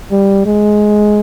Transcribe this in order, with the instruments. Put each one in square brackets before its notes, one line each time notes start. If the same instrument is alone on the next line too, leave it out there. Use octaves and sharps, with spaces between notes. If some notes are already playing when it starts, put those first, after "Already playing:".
[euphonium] G3
G#3